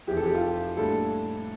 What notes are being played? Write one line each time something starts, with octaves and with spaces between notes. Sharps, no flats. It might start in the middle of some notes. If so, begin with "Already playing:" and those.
F1 F2 E3 G4
A4
G4
F4
A2 G3 A#3 D4 A4